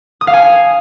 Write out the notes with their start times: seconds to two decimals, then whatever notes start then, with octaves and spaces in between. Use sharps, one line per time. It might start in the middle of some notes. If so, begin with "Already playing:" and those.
0.21 D#6
0.27 F5
0.33 G#5